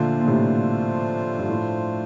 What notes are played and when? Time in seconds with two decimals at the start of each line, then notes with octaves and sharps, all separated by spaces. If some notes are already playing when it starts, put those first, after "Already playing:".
Already playing: A#2 D3 F3 A3 D4 F4 C5
0.20 A#2
0.28 A2 C3
1.39 G2
1.50 A2